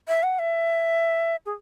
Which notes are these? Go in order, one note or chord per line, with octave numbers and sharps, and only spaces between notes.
E5
F#5
E5
G#4